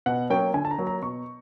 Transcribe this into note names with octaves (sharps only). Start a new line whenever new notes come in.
B2 F#5
F#3 A#3 C#4 G5
D3 G#5
A5
A#5
F#3 A#3
A#5
B2 C#6